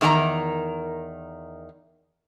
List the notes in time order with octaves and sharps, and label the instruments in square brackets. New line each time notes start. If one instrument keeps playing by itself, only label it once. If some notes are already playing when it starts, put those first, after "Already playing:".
[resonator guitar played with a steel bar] E2 D#3 A#4 G#5 A#5